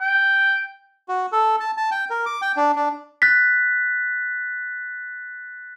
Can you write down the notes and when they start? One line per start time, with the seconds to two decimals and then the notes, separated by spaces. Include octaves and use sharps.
0.01 G5
1.08 F#4
1.32 A4
1.60 A5
1.77 A5
1.91 G5
2.10 A#4
2.26 D6
2.42 G5
2.57 D4
2.76 D4
3.22 F#6 A6 B6